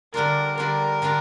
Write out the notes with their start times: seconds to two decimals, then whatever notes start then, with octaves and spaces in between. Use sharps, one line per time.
0.14 D3 G3 D4 F4 A#4
0.58 D3 G3 D4 F4 A#4
1.02 D3 G3 D4 F4